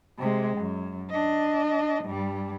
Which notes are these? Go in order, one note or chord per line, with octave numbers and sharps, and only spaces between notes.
C3 G#3
F#2
D4 D#5
G2 G3